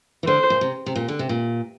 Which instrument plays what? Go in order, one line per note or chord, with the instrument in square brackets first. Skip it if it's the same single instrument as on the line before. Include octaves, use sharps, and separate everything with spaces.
[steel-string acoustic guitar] E3
[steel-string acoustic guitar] D3 [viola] C5
[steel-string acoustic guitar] A#2
C3
C3
A#2
D3
C3
A#2